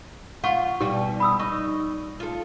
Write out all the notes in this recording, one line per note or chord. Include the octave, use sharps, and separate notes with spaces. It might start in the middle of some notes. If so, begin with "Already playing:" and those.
F4 F#5 C#6
B2 G3 G4
B5 D#6 E6
D#4 C#6
F4 A4